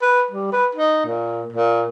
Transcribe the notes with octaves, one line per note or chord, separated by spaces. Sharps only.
B4
G3
B4
D#4
A#2
A#2